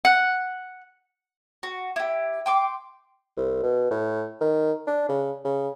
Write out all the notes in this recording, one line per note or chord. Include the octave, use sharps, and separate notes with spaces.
F#5
F#4
E4 G4
G5 C6 D6
C2
B2
A2
D#3
D4
C#3
C#3